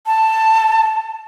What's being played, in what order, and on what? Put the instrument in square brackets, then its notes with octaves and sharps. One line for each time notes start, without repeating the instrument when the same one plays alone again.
[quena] A5